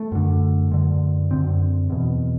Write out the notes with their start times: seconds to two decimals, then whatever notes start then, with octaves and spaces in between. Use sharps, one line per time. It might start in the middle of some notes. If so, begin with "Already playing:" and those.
Already playing: A3
0.12 F#2 D3
0.71 F#2 D3
1.31 F#2 D3 C4
1.90 E2 B2